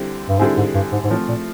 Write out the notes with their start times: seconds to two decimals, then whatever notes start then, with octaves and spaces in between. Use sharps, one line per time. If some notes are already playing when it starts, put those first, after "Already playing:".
Already playing: D3 G3 C4 E4
0.29 G2
0.39 G#2 D3 G3 C4 E4 G#4
0.58 G#2
0.75 G2
0.92 G#2
1.04 G#2
1.10 A2 F3 A3 C4
1.29 A#2